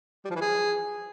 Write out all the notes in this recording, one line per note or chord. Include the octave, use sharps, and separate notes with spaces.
G3
F3
E3
G#4